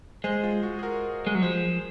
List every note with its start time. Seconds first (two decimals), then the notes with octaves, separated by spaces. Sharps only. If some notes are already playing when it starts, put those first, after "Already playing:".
0.24 G#3 C5 D#5
0.44 F4
0.63 F#4
0.79 G#4
0.83 F#4 A#4
1.27 G#3
1.35 F#3
1.42 F3 G#4 C5